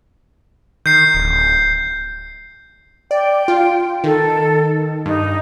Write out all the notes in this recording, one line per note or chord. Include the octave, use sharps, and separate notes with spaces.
D#3 G6 C7
D1
D5 G5
F4
D#3 A4
G2 D#4